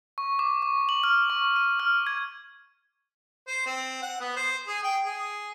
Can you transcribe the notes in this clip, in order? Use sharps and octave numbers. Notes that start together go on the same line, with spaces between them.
C#6
D6
C#6
F#7
F6
C#6
D#7
F6
G#6
C5
C4
F#5
B3
C5
G#4
G5
G#4